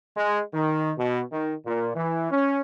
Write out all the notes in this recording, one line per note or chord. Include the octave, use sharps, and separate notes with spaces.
G#3
D#3
B2
D#3
A#2
E3
C#4